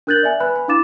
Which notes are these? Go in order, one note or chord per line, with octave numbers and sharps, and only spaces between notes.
D4 A#4 F#6 G6 A6 F#7
D5 E5 G#5
B4 G#5 B5 F#6
B5
D4 E4 F5 D6 A6 E7